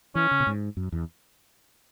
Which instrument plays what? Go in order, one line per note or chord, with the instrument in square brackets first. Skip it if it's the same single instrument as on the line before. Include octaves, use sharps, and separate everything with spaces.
[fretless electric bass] E3 [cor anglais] C#4
[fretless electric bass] C#3
B2
G#2
F#2
E2